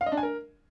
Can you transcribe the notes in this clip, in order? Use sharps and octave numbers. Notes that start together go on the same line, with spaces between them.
F5
D#5
D4
G#5
A#4